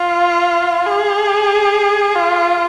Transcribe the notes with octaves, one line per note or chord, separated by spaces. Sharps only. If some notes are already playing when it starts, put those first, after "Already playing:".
Already playing: F4
G#4
F4